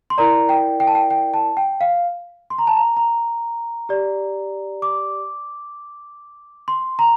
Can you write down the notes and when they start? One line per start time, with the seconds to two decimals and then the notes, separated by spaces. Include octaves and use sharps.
0.10 C6
0.18 E4 A#4 D5 A#5
0.49 G5
0.80 G5
0.87 A5
0.95 G5
1.10 G5
1.34 A5
1.57 G5
1.81 F5
2.50 C6
2.58 A#5
2.67 A5
2.76 A#5
2.97 A#5
3.89 G4 D5
4.82 D6
6.68 C6
6.99 A#5